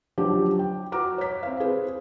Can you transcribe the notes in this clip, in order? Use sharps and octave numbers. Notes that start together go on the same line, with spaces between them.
F3 F#3 D4 G4
G5
F#4 A#5 D6 F6
C#5 B6
C4 F5
G#4 B4 C5